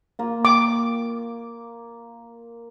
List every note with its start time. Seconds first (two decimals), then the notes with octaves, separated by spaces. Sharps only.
0.19 A#3 F4
0.45 D6